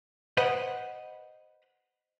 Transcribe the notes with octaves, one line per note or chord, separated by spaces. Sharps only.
B4 C5 D#5 F#5 B5